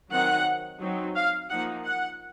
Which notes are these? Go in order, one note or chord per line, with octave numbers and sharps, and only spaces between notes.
D#3 F#3 C4 D#4 F#5
F#3 C4 D#4
F5
F3 A#3 D#4 F#5
F#5